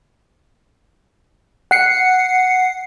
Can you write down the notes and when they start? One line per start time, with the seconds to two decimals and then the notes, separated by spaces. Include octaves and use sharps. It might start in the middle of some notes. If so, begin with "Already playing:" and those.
1.71 F#5 C7 C#7